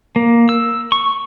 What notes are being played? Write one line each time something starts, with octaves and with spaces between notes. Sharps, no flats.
A#3
E6
C#6